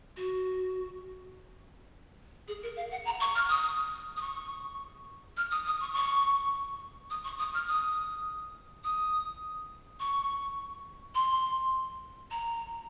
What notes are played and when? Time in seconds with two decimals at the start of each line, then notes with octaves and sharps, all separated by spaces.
0.17 F#4
2.48 G#4
2.63 A#4
2.76 F5
2.91 F#5
3.05 A#5
3.20 C#6
3.35 F6
3.49 D#6
4.17 D#6
4.21 C#6
5.37 F6
5.51 D#6
5.66 D#6
5.81 C#6
5.94 C#6
7.10 D#6
7.24 C#6
7.39 D#6
7.54 F6
7.68 D#6
8.84 D#6
10.00 C#6
11.15 C6
12.31 A#5